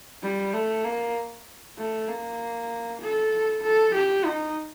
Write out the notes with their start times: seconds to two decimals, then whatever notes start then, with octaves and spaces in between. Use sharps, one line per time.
0.23 G3
0.54 A3
0.85 A#3
1.78 A3
2.08 A#3
3.02 A4
3.63 A4
3.94 G4
4.25 D#4